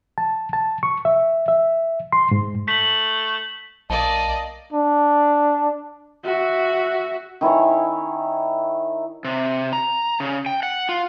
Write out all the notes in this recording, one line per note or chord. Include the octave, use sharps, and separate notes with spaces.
A5
A5
C#6
E5
E5
C6
G#2
A3 B6 F#7
B1 A#3 D5 D#5 A5
D4
F#4 E5
D#3 E4 C#5 G#5
C3
A#5
C#3
G5
F#5
F4